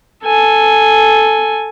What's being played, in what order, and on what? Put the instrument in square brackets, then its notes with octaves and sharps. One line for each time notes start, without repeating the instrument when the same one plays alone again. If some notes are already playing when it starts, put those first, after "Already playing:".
[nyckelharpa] A4 G#5